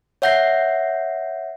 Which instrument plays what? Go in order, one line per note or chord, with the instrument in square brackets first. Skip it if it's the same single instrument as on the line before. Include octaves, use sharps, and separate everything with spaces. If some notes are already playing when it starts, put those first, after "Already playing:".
[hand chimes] C#5 E5 F#5 G6 A#6 C7